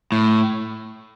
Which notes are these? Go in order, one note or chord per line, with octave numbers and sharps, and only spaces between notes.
A2